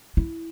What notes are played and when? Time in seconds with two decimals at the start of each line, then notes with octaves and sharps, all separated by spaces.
0.17 E4